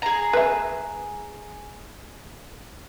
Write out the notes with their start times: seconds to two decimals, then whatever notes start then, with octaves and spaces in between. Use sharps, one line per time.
0.02 G#4 A#5
0.33 B4 E5